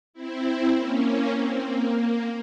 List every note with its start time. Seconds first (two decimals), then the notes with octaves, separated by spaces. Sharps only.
0.13 C4 E4
0.75 A#3 C#4
1.35 C4
1.66 A#3
1.96 A#3